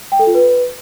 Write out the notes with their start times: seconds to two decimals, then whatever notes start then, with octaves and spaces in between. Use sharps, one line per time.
0.12 G5
0.19 A4
0.27 F4
0.35 B4